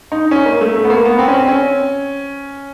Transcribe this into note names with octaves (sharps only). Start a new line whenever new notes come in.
D#4
C#4
A#3
A3
A3
B3
A#3
B3
C4
C#4
C4
C#4